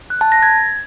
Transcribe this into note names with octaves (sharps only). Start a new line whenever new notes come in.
F#6
A5
A#6
G#6